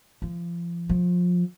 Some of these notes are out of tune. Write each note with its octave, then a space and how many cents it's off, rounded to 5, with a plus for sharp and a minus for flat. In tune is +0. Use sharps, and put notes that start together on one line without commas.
F3 -30
F3 +25